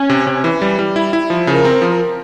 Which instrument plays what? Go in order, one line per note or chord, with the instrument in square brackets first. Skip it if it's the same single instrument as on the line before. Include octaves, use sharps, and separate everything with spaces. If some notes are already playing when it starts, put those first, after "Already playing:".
Already playing: [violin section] C#4
[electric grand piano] C3
C3
E3
G3
G3
E4
E4
F3
[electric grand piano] C#3 [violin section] A#4
[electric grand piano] C4
F3